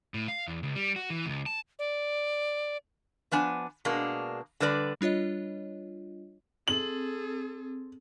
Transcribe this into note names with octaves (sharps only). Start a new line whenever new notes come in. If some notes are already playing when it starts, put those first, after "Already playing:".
A2
F5
E2
C#2
G3
F#4
E3
C#2
A5
D5
F3 B3 D4 G#5
B2 G#3 A#3 D4
D3 G3 B4 D5
G3 D4 F4 C#5 D#5
C4 G#4 A4 F#7